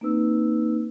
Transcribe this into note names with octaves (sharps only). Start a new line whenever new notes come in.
A#3 C4 D#4 B4 E6